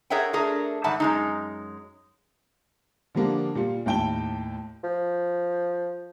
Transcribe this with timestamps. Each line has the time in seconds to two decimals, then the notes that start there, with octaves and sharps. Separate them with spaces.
0.10 G#4 A#4 C#5 E5 F#5 G5
0.33 A3 D4 G#4 A#4
0.84 G#2 D#3 G3 E5 F#5 A5
1.00 F#2 G#3 D#4
3.15 D3 F3 G3 A#3 D4
3.55 A#2 G3 F4
3.86 D#2 A2 G5 A5 G7
4.84 F3